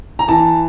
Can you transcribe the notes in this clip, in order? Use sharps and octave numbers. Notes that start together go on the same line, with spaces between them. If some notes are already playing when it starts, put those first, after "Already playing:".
A#5
E3 A5